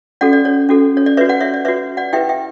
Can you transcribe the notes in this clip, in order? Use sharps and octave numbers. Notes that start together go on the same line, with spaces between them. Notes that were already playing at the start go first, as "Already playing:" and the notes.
C#4 F#4 A4 D5 F#5
D5
C#5
C#4 F#4 A4
C#5
D5
F#4 B4 C#5 E5
D5 F#5
C#5 E5
D5
F#4 B4 C#5 E5
D5 F#5
E4 G4 B4 E5 G5
E5 G5